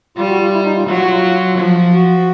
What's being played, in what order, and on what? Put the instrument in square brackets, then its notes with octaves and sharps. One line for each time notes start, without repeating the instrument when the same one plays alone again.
[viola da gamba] G3 [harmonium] F4
[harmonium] F#4
F4
E4
D#4
F4
[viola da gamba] F#3 [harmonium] F4
[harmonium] F#4
F4
[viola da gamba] F3
[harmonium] F#4